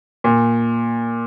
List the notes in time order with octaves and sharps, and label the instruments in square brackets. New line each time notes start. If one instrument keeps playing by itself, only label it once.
[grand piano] A#2